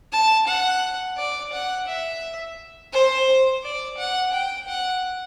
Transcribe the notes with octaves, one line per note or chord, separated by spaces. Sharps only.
A5
F#5
D5
F#5
E5
C5
D5
F#5
G5
F#5